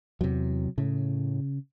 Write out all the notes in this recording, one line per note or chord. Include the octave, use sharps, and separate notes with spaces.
E2 C3 F#3
A2 C#3